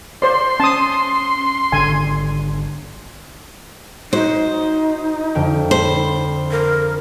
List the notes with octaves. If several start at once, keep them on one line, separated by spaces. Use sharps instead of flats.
C5 D5 C6
C#4 A5 D#6
G#1 D3 G#5
D#4 F#4 C5
F2 D3 G5
C5 B5
A#4